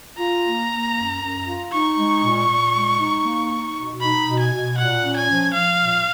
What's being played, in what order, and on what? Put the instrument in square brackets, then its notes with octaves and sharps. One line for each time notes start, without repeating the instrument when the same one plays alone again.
[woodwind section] F4 [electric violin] A#5
[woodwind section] A#3
A#3
F#2
F#2
F4
[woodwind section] D#4 [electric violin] C#6
[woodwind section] G#3
A#2
A#2
G#3
D#4
A#3
D#4
B2
[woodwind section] D#4 [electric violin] B5
[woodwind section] B2
[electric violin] G#5
[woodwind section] B2
[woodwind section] A#2 [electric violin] F#5
[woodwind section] C#4
[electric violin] G#5
[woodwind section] F3
[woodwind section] F3 [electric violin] F5
[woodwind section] A#2